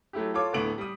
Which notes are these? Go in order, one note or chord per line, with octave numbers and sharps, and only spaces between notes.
F#3 A3 E4 G4
F4 A4 C#5 D6
D1 A2 D3 B3 D7 F#7
G3 D#6